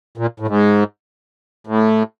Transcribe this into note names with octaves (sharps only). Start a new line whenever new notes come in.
A#2
A2
G#2
A2